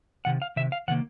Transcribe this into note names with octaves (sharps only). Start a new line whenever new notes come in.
C3 D#3 F#5
F5
C3 D#3 E5
F5
C3 D#3 A#3 F#5